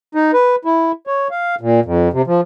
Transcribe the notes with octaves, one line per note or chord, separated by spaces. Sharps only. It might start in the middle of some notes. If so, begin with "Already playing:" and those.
D#4
B4
E4
C#5
F5
A#2
F2
C3
F3